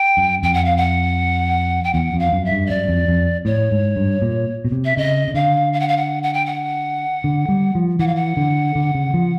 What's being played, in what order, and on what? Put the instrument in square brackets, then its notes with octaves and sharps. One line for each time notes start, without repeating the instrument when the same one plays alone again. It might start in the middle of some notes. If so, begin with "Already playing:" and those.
Already playing: [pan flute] G5
[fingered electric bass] F#2
[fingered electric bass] F2 [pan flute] G5
[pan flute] F#5
F5
F#5
G5
[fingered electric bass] E2 [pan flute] F#5
[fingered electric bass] F2
[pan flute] F5
[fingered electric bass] F#2
[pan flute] E5
[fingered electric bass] G2
[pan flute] D#5
[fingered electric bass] F#2 [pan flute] D5
[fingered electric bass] F2
F2
[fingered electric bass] A2 [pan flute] C#5
[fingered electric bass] G#2
G2
A#2
B2
C3
[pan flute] E5
[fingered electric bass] C#3 [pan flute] D#5
[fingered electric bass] C#3
[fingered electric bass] D3 [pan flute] F5
[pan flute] F5
F#5
F5
F#5
F#5
G5
F#5
[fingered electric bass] D3
G3
F3
[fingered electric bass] E3 [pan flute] F#5
[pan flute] F5
F#5
[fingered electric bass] D3
D3
C#3
F3